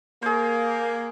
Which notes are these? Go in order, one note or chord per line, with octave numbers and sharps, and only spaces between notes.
A#3 G#4 C5